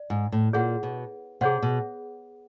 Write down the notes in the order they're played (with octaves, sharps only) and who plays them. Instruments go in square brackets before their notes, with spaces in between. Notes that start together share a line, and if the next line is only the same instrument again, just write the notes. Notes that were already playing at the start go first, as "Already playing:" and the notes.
Already playing: [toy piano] D5
[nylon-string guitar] G#2
A2
[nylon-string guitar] A#2 [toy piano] G#4 C#5 F#5
[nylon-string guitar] B2
[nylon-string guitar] C3 [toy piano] G#4 C#5 F#5
[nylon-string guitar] B2